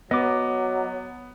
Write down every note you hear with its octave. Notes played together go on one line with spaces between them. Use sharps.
F#3 B3 D#5 D6